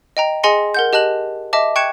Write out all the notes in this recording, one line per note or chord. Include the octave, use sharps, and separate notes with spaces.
D#5 G5 A#5
G#4 D#5 G#5 C6 A#6 C#7
A#4 F#5 G6
G4 D#5 A5 F#6 F#7
D#5 E5 A5 D6
G5 C#6 F#6 G#6 C#7 E7